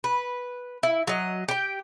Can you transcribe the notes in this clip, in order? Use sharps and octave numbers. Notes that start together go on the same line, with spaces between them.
B4
E4
F#3 D#5
G4 G5